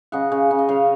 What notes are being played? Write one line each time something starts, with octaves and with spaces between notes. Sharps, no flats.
C#3 D#5 F#5
C#3
C#3
D#5
C#3 C#5 F5